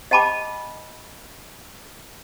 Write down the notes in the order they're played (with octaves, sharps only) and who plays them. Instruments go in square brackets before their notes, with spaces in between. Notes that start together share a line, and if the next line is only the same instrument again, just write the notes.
[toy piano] D#5 G5 A5 B5 D6